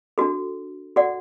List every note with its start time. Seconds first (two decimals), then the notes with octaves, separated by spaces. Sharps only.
0.18 D4 F#4 A4
0.96 F#4 A4 D5 F#5